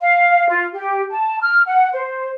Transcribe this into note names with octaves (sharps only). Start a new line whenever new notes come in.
F5
F4
G4
A5
F6
F#5
C5